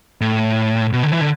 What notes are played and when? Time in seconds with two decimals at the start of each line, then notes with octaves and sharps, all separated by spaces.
0.21 A2
0.93 B2
1.03 D3
1.12 E3
1.21 D3